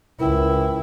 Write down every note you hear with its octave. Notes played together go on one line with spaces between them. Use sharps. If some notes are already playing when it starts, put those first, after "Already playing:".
C#2 E4 A#4 B4 G5